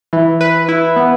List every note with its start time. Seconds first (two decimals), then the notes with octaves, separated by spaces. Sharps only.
0.13 E3
0.41 B4
0.68 E4
0.96 B3